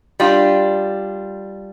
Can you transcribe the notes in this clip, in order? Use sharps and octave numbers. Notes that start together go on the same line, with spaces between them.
G3 D4 F4